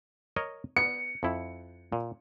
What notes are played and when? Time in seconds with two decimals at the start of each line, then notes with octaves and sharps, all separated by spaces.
0.36 A#4 C#5 D#5
0.77 B3 C#7
1.23 F2 E4
1.92 A#2